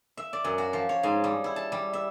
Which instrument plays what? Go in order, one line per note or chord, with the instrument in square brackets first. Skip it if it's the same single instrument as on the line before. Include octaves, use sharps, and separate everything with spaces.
[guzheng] E5
D5
F#2
F#4
F3
C#5
G#2
G3
E4
A5
G3
E5